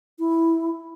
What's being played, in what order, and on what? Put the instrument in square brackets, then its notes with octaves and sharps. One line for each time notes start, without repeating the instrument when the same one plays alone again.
[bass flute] E4